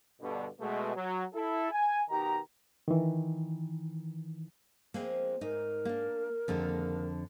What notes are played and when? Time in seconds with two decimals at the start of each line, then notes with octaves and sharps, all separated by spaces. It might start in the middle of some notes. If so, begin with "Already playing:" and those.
0.21 G2 B2 D3
0.60 B2 G#3 A3
0.95 F#3
1.34 E4 A4
1.72 G#5
2.10 B2 D#3 D#4 G4 A#5
2.88 D#3 E3
4.94 F3 G#3 A#3 C4
5.41 G#2 D#4 A#4
5.85 A#3 D4
6.48 F2 D3 D#3 G#3 A#3